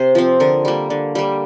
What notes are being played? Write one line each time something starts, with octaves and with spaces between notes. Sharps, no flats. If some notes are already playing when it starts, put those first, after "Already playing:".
Already playing: C3 C5
F3 C4
D3 A#4
G3 A#3
D3
G3 A#3